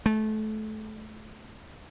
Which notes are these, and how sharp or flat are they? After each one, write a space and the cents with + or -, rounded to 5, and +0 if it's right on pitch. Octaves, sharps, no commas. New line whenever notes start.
A3 -25